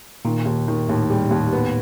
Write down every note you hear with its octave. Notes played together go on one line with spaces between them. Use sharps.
A#2 D#3
D#2
D#3
D#2 A2
G3
D#2
B3